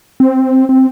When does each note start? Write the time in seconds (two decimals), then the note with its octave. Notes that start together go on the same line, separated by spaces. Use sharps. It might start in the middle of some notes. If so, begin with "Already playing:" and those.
0.20 C4
0.69 C4